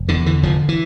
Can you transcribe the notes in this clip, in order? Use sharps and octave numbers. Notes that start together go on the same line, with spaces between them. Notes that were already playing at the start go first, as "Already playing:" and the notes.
Already playing: F1
E2 D3
D3 E3
F1 F3
E3